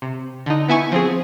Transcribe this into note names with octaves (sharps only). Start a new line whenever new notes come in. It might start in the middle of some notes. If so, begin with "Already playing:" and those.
C3
D3 D#4
B3 E4 G#5 C#6
F3 C4 G#4